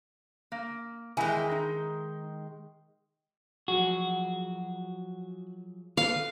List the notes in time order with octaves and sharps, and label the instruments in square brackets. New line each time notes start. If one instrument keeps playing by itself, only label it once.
[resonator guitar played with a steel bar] A#3
[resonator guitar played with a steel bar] E2 E4 G#5 [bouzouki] D#3 G#3
[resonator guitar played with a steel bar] D#4
[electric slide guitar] F3 F#3 G#4 [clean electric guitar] F#4
[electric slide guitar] A4 B4 [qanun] F5